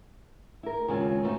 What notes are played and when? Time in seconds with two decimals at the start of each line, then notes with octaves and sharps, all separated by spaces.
0.63 E4 A#4
0.88 D#2 C#3 G#3 C4 F4
1.23 A3 B3 D#4 F4 F#4 C5